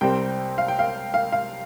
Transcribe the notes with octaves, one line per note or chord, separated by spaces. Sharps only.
C2 C3 G3 C4 G5
F5
G5
F5
F5
F5